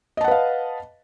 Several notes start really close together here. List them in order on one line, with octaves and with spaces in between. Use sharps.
D#5 A5 F#5 B4 F5